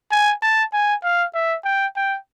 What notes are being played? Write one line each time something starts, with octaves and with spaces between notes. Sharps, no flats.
G#5
A5
G#5
F5
E5
G5
G5